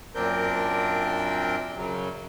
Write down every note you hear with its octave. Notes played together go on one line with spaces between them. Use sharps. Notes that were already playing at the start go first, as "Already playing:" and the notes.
F#2 A#2 C4 D4 A#4 G5
F#2 C#3 F#3